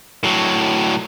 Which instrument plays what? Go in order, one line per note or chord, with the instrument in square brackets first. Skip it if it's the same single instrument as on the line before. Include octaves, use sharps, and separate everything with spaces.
[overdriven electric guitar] A2 F#3